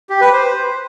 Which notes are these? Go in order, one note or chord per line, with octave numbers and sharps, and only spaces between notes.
G4
B4
C5